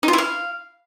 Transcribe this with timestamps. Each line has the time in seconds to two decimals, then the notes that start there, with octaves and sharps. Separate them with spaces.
0.03 D#4
0.08 F4
0.13 E4
0.18 F5